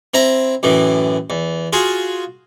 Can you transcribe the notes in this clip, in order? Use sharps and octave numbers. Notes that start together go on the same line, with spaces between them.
C4 E4 A#5
F#2 A2 E3
E2
F4 F#4 G#4